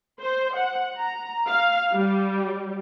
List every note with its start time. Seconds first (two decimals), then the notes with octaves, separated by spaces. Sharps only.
0.21 C5
0.56 F#5
0.97 A#5
1.48 F5
1.92 G3